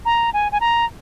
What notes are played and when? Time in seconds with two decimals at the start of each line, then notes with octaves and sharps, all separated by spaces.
0.05 A#5
0.33 G#5
0.52 G#5
0.60 A#5